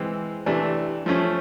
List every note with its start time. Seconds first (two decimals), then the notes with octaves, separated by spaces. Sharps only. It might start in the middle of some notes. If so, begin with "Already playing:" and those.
Already playing: E3 G#3 C4
0.46 C3 E3 A3 D4
1.06 F3 A3 C#4